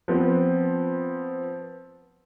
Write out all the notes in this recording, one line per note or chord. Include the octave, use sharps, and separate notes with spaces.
F3 B3 C4